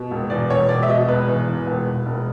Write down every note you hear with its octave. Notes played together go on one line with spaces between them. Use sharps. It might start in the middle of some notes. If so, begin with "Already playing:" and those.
Already playing: B2
E1
E2 D5
E1 C#5
E1 D5
E5
B2 D#5
E1 B4
E2
E2
E1
E1
E1